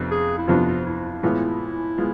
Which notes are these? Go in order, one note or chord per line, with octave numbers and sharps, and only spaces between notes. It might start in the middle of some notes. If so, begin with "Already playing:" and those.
Already playing: F2 C3 F3 B3 D4
G#4
E4
F2 C3 F3 B3 D4 F4
F4
E4
E4
A2 E3 G#3 B3 F4
G#3 B3 F4